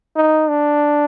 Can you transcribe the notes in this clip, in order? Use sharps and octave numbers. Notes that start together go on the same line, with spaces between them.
D#4
D4